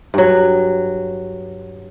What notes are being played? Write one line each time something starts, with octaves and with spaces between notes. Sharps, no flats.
G2 F#3